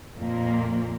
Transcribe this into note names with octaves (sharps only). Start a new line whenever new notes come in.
F2 A#2 A#3